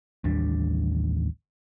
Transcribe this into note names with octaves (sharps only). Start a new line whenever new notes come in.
A1 D#2 G3 D4